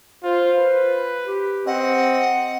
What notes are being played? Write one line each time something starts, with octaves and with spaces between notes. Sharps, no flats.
F4 C5
B4
G4
C4 D#5 F#5